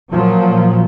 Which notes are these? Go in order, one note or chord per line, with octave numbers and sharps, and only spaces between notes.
A#2 F3 F#3